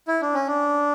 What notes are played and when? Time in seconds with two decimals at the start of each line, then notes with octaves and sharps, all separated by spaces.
0.08 E4
0.21 D4
0.34 C#4
0.47 D4